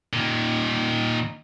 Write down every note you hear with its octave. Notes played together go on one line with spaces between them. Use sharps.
A#2 D#3